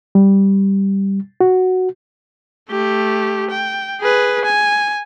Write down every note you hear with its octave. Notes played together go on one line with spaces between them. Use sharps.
G3
F#4
A3 G4
G5
G#4 B4
G#5